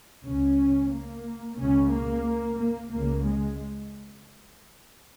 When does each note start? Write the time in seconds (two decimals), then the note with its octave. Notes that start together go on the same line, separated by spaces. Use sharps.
0.24 C#2 C#3 C#4
0.91 A#3
1.58 C#2 C#3 C#4
1.91 A#3
2.58 A#3
2.91 C#2 C#3 A#3
3.25 G#3